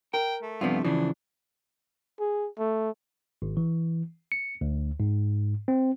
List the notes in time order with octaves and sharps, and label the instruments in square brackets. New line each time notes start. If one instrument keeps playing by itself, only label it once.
[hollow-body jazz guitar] A#4 [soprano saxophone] G5
[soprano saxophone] A3
[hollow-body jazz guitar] G2 C3 F3 [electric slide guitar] B3 F4
[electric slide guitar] C#3 F3 [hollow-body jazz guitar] E3 [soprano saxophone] D4
[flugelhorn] G#4
A3
[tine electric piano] G#1
E3
C#7
D2
G#2
C4